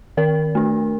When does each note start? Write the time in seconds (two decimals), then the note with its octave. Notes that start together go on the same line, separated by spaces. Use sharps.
0.17 D#3 A#4
0.55 A3 D4